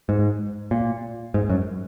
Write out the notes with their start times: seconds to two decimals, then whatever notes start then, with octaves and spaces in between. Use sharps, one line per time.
0.09 G#2
0.71 A#2
1.34 G#2
1.49 F#2